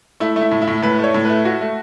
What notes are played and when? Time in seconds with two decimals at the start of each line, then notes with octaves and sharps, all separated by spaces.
0.20 A3 E4
0.36 A3
0.41 E4
0.51 A2
0.62 E4
0.67 A2
0.82 A2 B4
0.99 A3 C#5
1.14 A2
1.25 A3 B4
1.45 A3 F#4
1.61 A3